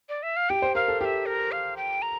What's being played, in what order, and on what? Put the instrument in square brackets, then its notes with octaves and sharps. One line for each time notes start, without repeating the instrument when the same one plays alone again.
[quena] D5
E5
F5
[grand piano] G4 [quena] G5
[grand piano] C5
[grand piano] A#4 [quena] F5
[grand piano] A4
[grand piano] G4 [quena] E5 F5
[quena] A#4
F5
G5
A#5